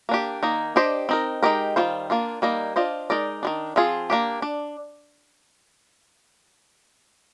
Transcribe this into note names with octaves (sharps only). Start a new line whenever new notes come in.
A#3 D4 G4
D#3 A#3 D#4
D4 G4 C5 D#5
C4 D#4 A#4
G#3 D#4 G4 A#4
D#3 G3 A#3 F4 C5
A#3 D4 F4
G3 A#3 D#4
D4 F4 C5 D#5
G#3 D#4 A#4 D5
D#3 G#3 D4
F3 C4 F4 G#4
A#3 D4 G4
D4